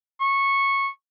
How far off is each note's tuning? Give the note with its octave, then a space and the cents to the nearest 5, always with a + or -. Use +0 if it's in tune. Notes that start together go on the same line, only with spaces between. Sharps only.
C#6 -10